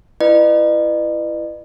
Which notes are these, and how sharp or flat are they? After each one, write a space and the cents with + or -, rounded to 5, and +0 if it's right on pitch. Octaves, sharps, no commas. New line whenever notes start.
E4 +20 B4 +0 D#5 -45